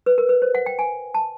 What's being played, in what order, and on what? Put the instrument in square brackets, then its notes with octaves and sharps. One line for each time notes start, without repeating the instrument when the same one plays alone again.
[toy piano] B4
A#4
B4
C5
F#5
G5
G#5
A5